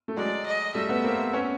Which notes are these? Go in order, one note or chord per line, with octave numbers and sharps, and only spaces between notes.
A3
F#3 G#3 D5
D#5
G3 A3 E5
A3 B3
A#3 C4
B3 C#4